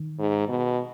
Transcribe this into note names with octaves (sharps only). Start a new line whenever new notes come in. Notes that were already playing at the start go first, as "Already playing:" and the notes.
Already playing: D#3
G#2
B2